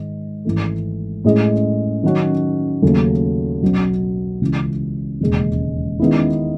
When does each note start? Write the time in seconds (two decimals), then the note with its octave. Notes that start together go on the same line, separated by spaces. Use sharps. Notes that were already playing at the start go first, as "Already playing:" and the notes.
Already playing: G#2 D#3 G#3
0.45 G#1 G#2 E3 A3
1.24 A2 G#3 C#4 G#4 D#5
2.03 D#3 F#3 C#4 F#4
2.82 D#2 C#3 F#3 A3
3.62 B1 B2 F#3 B3
4.41 C#2 C#3 E3
5.21 E1 D#2 C#3 G#3
5.99 D#3 G#3 B3 E4